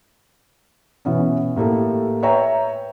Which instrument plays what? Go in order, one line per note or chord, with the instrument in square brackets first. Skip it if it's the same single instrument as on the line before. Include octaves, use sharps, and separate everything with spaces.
[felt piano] B2 E3 B3 C#4
A2 A#3 G4 A4
B4 C#5 E5 G5 A#5